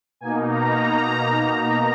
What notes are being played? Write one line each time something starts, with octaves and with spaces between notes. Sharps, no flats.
B2 A#3 D#4 G#5
A#5